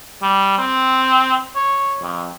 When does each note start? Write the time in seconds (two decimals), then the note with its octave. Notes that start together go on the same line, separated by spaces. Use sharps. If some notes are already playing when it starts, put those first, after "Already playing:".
0.22 G3
0.59 C4
1.56 C#5
2.02 F2